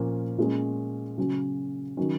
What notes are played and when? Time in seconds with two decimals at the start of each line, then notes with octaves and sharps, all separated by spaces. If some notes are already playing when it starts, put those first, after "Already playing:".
Already playing: A#2 F3 A#3 C#4
0.38 A#2 G#3 C#4
1.18 C#3 F#3 C#4
1.97 D#3 F#3 C#4